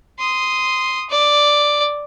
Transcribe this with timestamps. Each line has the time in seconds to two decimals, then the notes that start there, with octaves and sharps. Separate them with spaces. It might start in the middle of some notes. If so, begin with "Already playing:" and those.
0.20 C6 D#6
1.10 D5